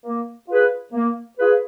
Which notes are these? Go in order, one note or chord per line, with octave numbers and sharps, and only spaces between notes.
A#3
F4 G#4 B4
A#3
F4 G#4 B4